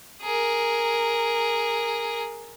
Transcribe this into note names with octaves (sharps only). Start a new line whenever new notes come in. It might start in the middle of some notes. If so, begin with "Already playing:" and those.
G#4 A#4